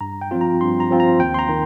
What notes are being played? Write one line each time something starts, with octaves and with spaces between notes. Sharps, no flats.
G2 A#5
G5
F3 C4 F4
A#5
G2 C6
A#5
F3 C4 F4
A#5
D#2 G5
C6
A#5
D#3